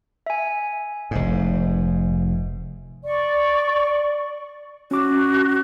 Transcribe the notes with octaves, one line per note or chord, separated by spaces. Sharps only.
E5 G#5
F1 G#2
D5 C#6
C#4 F#4 D6